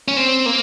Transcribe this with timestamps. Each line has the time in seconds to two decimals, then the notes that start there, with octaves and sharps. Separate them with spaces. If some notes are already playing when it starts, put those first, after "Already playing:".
0.08 C#4
0.17 C4
0.46 A#3